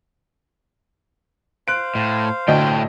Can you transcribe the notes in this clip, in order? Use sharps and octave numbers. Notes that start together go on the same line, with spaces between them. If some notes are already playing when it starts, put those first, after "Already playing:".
C5 F5 F#6 D7
A2
D2 A2 D#5 G5